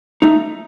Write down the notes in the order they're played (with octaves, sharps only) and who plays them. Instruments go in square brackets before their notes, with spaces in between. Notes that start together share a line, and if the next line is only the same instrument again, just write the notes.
[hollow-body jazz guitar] A3 D#4